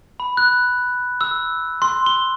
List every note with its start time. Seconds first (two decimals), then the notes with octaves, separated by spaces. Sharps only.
0.20 B5
0.37 F#6
1.21 E6
1.82 C6
2.06 G7